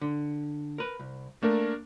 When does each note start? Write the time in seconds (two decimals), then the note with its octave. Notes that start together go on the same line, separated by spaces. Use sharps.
0.01 D3
0.78 A#4 B4
1.00 C2
1.43 A3 A#3 D4 A#4